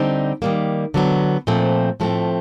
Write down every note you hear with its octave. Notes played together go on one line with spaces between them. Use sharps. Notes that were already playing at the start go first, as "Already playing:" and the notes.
Already playing: D3 G3 C4 D#4
D#3 G3 A#3
D3 F#3 B3
A#2 F3 A3 C4
A2 F3 A3 C4